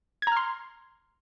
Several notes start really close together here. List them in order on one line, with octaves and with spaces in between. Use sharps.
G#6 A#5 F6 C6